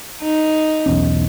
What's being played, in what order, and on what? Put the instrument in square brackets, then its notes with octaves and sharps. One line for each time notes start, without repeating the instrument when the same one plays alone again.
[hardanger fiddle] D#4
[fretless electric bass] B1 E2 C#4